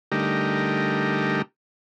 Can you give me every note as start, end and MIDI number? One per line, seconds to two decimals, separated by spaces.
0.12 1.42 50
0.12 1.42 55
0.12 1.42 57
0.12 1.42 63
0.12 1.42 67
0.12 1.42 70